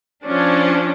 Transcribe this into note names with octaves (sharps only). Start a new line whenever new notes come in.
F3 C#4 D4